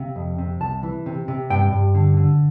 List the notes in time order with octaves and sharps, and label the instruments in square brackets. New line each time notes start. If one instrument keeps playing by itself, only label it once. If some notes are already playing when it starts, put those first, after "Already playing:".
Already playing: [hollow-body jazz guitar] C3 F5
F2
C3
C2 A5
E3
C3
C3
G2 G5
G2
D3
D3